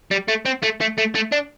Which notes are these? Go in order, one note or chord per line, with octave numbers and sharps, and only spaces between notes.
G3
A3
C4
A3
A3
A3
A3
D4